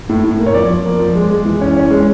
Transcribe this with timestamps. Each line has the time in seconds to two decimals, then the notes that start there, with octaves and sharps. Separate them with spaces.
0.09 A2
0.24 A2
0.39 A#3
0.46 C#5
0.54 F3 D5
0.70 F3
0.85 A#3
1.00 F3
1.15 G#3
1.30 G#3
1.45 E3
1.61 C#4
1.77 C#4
1.91 G#3